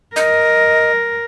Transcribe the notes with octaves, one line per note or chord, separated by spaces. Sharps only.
A#4 D#5